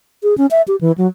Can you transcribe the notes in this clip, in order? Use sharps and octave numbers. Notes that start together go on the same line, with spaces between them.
G#4
C#4
E5
G4
E3
F#3